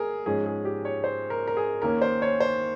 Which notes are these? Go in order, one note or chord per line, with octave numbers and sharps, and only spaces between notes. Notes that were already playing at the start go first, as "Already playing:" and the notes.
Already playing: G#4 A#4
G#2 F3 G#3 C#4 G#4
G#4
G4
C#5
C5
A#4
A#4
G#4
D#2 D#3 A#3 C#4 A#4
C5
C#5
C5